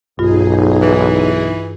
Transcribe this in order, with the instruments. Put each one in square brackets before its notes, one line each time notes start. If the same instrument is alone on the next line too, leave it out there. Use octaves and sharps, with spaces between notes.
[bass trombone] B1 [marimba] G2 F4 [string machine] D#4 G#4
[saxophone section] E3